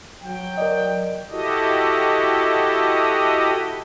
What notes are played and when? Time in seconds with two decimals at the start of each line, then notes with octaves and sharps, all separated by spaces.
0.23 F#3 G5
0.58 A#4 D5 D#5
1.31 E4 F#4 G4 A4 D#5